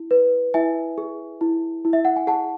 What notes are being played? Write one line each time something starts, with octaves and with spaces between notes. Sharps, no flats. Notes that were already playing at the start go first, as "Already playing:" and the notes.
Already playing: E4
B4
E4 E5 G#5
G#4
E4
E4
E5
F#5
G#5
G#4 F#5 A5